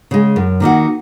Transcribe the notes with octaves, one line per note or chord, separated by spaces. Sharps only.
C#3 G#3
F#2
D#3 A#3 D#4 F#4